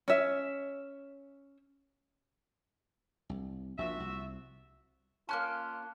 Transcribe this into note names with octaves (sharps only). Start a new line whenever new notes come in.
C#4 E5
C2
A#1 A#2 F3 F#4 E5
C2
A#3 C4 C#4 F4 A5 F#6